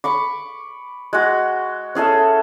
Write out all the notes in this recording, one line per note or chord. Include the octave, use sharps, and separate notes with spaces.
B5 C#6 D6
G#3 F#4
C#4 G#4 A4 E5